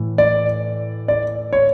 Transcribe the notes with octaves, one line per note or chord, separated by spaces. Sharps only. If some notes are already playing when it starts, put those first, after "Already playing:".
Already playing: A2 E3
D5
D5
C#5